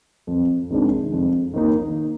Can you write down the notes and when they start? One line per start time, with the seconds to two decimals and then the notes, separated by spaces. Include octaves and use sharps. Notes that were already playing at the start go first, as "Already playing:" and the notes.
0.27 F2
0.70 C3 D#3 G#3 D4
1.12 F2
1.54 D#3 A#3 D#4